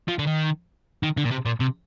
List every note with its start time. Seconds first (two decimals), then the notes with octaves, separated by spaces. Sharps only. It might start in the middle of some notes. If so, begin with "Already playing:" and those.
0.08 F3
0.19 D3
0.27 D#3
1.03 D#3
1.17 D3
1.25 A#2
1.31 C3
1.45 A#2
1.60 C3